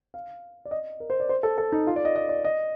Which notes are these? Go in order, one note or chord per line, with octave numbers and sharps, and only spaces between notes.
F5
D5
D#5
A#4
C5
D5
C5
A4
A4
D#4
F4
D5
D#5
D#5
D5
D#5